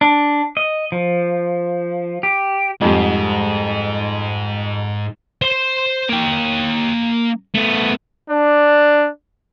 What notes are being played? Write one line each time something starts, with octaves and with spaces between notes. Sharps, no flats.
D4
D#5
F3
G4
F2 G#2 G3
C5 C6
A#3 G5
A3 B3
D4